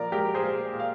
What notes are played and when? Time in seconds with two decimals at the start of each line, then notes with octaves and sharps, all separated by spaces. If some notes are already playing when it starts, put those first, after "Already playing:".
Already playing: A#2 F3 A#4 D5 A#5
0.12 G#3 G4 A#4
0.35 G#4 C5
0.42 A#2
0.73 A#2
0.79 F5